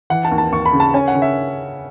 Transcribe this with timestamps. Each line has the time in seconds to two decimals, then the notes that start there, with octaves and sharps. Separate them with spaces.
0.10 E3 F#5
0.25 A5
0.31 D#2
0.38 A5
0.52 D#2 C#6
0.66 B5
0.73 C#3
0.80 A5
0.94 C#4 G#5
1.08 F#5
1.15 C#3
1.22 E5